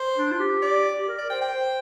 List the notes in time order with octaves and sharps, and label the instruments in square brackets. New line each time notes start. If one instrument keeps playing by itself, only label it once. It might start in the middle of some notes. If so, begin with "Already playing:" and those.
Already playing: [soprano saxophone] C5
[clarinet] D4
F4
G4
[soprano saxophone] D5
[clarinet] G4
A#4
[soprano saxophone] D5
[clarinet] C5 [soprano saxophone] G5
[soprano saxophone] G5
[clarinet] C5